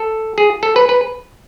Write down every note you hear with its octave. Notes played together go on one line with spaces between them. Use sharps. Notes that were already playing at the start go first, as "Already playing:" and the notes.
Already playing: A4
G#4
A4
B4
B4